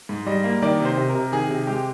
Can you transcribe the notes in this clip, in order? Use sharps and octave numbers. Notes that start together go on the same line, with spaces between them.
G#2
G3 D#5
A#3
D#3 D5
C3 C5
C3
A#4
C3
D#3 G#4
C3
G#3 G4